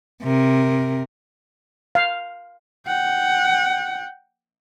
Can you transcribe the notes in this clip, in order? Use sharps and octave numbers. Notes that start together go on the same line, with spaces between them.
C3 A#4
F5
F#5 G5